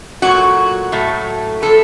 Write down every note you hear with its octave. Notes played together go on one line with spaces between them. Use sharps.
A#2 F#3 A3 F#4
A2 F#3 A3
A2 F3 A3 A4